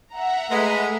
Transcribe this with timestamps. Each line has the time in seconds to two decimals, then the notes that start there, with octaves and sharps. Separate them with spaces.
0.13 E5 F#5 A#5
0.50 G#3 A3 B4